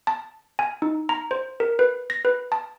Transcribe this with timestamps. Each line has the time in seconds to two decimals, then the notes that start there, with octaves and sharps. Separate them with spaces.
0.07 A5
0.59 G#5
0.82 D#4
1.09 A#5
1.31 C5
1.60 A#4
1.79 B4
2.10 A#6
2.25 B4
2.52 A5